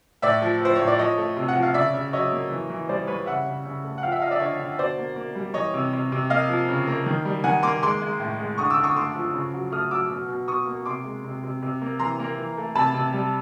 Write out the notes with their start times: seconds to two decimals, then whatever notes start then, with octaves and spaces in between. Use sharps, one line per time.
0.22 A2 D5 E5
0.42 F3
0.61 F3 C5
0.76 A2 C#5
0.88 D5
0.98 F3 C#5 D#5
1.18 A3
1.37 C3
1.48 F#5
1.55 F3
1.63 F5
1.74 C#3 D5 E5
1.94 C#3
2.13 F#3 C#5 D#5
2.32 A#3
2.50 E3
2.70 E3
2.89 G3 C5 D5
3.07 G3 B4 C#5
3.26 C#3 E5 F#5
3.46 C#3
3.65 C#3
3.84 A3
3.98 F#5
4.03 F3 F5 G5
4.12 E5 F#5
4.21 F3 D#5 F5
4.31 D5 E5
4.40 D3 C#5 D#5
4.59 D3
4.79 B2 C5 D5
4.98 A#3
5.16 A#3
5.35 G3
5.54 E3 C#5 D#5
5.74 C3
5.93 C3
6.12 C3
6.30 A#3 D#5 F5
6.49 F3
6.68 C#3
6.87 A#3
7.06 D#3
7.25 G3
7.44 D#3 F#5 G#5
7.63 A#3 C6 D6
7.82 G#3 C6 D6
8.02 G#3
8.20 A2
8.39 G#3
8.58 D3 C#6 D#6
8.70 D6 E6
8.77 D3
8.84 C#6 D#6
8.96 A3 C6 D6
9.15 F3
9.34 C#3
9.53 F#3
9.72 A3 D#6 F6
9.91 F#3 D6 E6
10.10 B2
10.29 B2
10.48 B2 C#6 D#6
10.67 A#3
10.86 C3 C6 D6
11.04 G#3
11.25 C3
11.44 C3
11.62 C3
11.82 A#3
11.99 E3 A#5 C6
12.20 A#3
12.38 E3
12.58 A3
12.75 C3 A5 B5
12.94 C3
13.13 G3